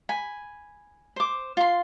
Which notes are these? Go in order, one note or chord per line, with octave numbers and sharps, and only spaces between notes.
G#5 B5
C5 D6
F4 C6